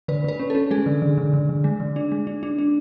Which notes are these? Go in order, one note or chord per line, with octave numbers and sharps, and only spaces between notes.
D3 B4
D3 B4
C#4
C#4 A4
G#3 G#4
D3
D3
D3
D3
D3
G#3
D3
D4
G#3
D4
D4
D4